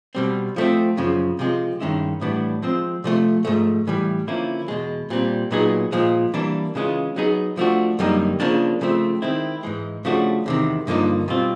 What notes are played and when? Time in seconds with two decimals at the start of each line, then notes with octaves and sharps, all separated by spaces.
0.15 B2 G3 C4
0.56 F3 A3 C4
0.97 F#2 C#3 F3
1.39 C3 F3 G#3
1.80 G2 D#3 G#3 C#4 E4
2.21 A2 E3 G3 B3 D4
2.63 F3 G#3 C4
3.04 C3 F3 A3
3.45 G#2 F3 A3
3.87 A2 E3 G3
4.27 D3 F3 A#3 C#4 E4
4.68 E2 B2 G#3
5.10 A#2 G3 C4
5.51 A#2 F#3 B3 D#4 G#4
5.92 A#2 F3 G#3
6.34 E3 G3 A#3 D4
6.75 C#3 E3 G#3 C#4 F4
7.16 F#3 B3 D#4 G#4
7.57 F3 A3 D4 F#4
7.99 F#2 D3 G3 A#3 D#4
8.40 C#3 F3 A#3 D4
8.81 C#3 F3 A3 C4
9.22 D#3 G#3 C4 E4
9.63 G#2 E3 G#3
10.05 C#3 F3 A3 D4 F#4
10.46 E2 C3 D#3
10.87 G2 D3 F3 A#3 D#4
11.28 B2 G3 C4 F4